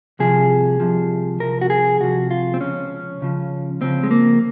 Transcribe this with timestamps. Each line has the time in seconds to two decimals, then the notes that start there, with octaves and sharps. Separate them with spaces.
0.19 C2 C3 F3 G#4
0.80 C2 C3 F3
1.40 C2 C3 F3 A#4
1.61 F#4
1.70 G#4
2.00 C2 C3 F3 F#4
2.31 F4
2.54 C4
2.60 C#2 C#3 F3 C#4
3.21 C#2 C#3 F3
3.81 C#2 C#3 F3 C4
4.03 G#3
4.11 A#3